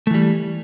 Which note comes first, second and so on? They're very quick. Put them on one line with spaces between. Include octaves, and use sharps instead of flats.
A3 E3 G3